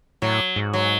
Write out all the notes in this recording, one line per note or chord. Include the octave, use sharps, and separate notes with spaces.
A2 F#3
G#2
F#3